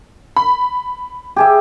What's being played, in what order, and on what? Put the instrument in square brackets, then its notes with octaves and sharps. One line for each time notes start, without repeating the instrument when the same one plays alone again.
[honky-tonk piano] B5
[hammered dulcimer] G4 G#4 E5